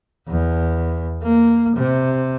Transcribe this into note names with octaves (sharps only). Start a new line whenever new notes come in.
E2
A#3
C3